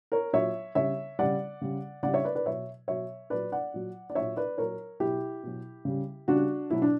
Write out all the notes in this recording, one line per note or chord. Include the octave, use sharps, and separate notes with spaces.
A#4 C#5
A#2 F#3 C#5 E5
C#3 G3 C#5 E5
C#3 G3 D5 F#5
C#3 G3
C#3 G3 D5 F#5
C#5 E5
B4 D5
B4 D5
B2 F#3 C#5 E5
B2 F#3 C#5 E5
A#2 F#3 B4 D5
D5 F#5
A#2 F#3
D5
A#2 F#3 C#5 E5
B4 D5
A#2 F#3 A#4 C#5
B2 F#3 E4 G4
B2 F#3
C#3 G3
C#3 G3 D4 F#4
B2 F#3 E4
D4